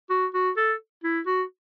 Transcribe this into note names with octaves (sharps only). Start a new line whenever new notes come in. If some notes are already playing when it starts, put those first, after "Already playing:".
F#4
F#4
A4
E4
F#4